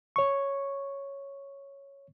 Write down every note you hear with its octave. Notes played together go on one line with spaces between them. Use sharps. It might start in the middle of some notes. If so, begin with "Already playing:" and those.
C#5 C#6